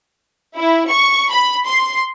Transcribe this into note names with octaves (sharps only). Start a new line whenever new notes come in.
E4
C#6
B5
C6